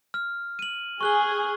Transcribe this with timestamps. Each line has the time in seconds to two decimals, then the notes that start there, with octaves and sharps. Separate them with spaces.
0.14 F6
0.59 D#7 F#7
1.01 G#4 C#6 F#6 G7